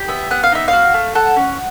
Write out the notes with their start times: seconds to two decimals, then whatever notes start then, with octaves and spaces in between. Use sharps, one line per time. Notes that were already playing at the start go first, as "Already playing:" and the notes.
Already playing: G4
0.08 B3 E5
0.31 B3 F#5
0.43 F5
0.52 D#4 E5
0.68 F#4 F5
0.94 A3
1.15 A4 F#5
1.36 C#4